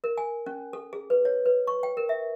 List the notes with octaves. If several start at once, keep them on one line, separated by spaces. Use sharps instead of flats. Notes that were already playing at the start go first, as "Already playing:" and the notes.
A#4
G#5
C#4
A4
G#4
B4
C#5
B4
C#6
G5
A#4
E5